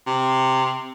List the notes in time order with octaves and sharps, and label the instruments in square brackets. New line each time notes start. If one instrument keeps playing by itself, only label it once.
[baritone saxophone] C3